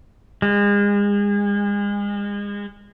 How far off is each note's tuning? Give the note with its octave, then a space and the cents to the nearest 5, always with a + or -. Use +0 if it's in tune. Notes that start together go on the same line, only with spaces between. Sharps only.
G#3 -35